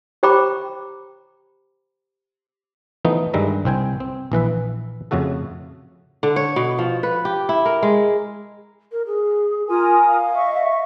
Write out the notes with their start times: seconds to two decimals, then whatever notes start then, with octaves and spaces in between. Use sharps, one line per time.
0.23 G4 C5 G5 A#5 B5 D6
3.05 E3 F3 A3 B3 D#4
3.34 G2 D#3 G3 G#3 E5 A#5
3.65 C2 C4 G5 G#5
4.00 C4
4.32 A#1 E3 B4 E5
5.11 F2 C#3 A3 F#4 A4
6.23 D3
6.36 C#5
6.56 B2
6.78 F3
7.03 B4
7.25 G4
7.49 E4
7.65 A#4
7.82 G#3
8.92 A#4
9.06 G#4
9.69 F4 A#4 G#5 D#6
10.07 F5
10.34 D#5 E5 C#6